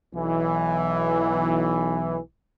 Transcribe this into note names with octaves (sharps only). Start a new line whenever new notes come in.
B1 E3